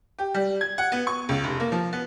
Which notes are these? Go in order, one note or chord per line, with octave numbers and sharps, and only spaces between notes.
G4
G3
G#6
F#5
B3
C#6
C#2
F1
A#3
F3
B3